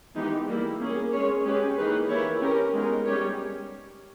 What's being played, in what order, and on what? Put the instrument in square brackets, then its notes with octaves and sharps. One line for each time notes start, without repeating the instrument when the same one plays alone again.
[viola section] E3 G#3 B3 D#4 G4
G3 A#3 E4
A#3 C#4 G#4
G#3 C#4 G#4 C#5
G#3 C#4 G4 B4
E3 A#3 D#4 G#4 B4
E3 A#3 E4 G4 C#5
C#4 G4 A#4
G#3 B3 D#4 A#4
G3 C#4 G4 C#5